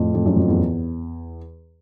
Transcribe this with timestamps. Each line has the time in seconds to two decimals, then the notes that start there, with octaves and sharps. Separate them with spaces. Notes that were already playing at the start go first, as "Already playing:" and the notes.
Already playing: F2 A2
0.14 F2
0.26 F#2
0.36 F2
0.48 E2